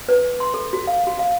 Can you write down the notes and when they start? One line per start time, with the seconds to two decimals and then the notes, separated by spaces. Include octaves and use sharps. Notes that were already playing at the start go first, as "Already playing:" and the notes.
0.09 B4
0.40 C6
0.54 A4
0.73 F#4
0.87 F5
1.07 F#4
1.19 F5